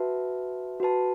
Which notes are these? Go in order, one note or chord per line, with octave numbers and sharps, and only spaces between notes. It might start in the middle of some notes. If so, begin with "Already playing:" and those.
Already playing: F#4 B4 E5 A5
F#4 B4 A5